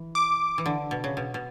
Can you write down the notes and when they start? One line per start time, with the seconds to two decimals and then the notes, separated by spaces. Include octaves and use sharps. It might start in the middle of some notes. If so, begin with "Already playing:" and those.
Already playing: E3
0.15 D6
0.58 E3
0.66 D3
0.91 B2
1.04 C#3
1.17 B2
1.34 B2